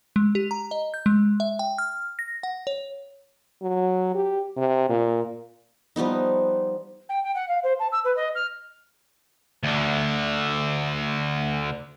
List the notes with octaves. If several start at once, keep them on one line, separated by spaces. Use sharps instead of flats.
G#3
G4
A#5
D#5
G6
G#3
E5
G5
F6
A#6
F#5
C#5
F#3
G4
C3
A#2
F3 G3 B3 D#4
G5
G5
F#5
F5
C5
A5
E6
B4
D#5
F6
D2 D3